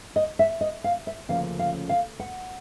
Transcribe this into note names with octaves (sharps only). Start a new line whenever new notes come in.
D#5
E5
D#5
F5
E5
D2 C#3 F3 A#3 C#4 F5
F5
F5
F#5